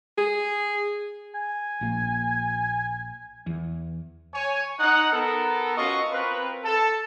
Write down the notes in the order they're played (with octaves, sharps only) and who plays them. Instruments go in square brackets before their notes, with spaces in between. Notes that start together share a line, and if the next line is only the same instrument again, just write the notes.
[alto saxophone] G#4
[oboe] G#5
[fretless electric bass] A#1 A#3
E2
[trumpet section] C#5 G#5
D#4 F#5
B3 A4 A#4
C#4 F4 F#4 D#5 F5 C#6
C4 F4 A#4 B4
A4 A5